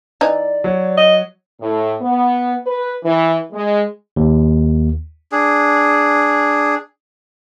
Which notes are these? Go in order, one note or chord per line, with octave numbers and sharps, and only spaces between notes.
E3 D#4 D5
F#3
D#5
A2
B3
B4
E3
G#3
D#2
D4 G#4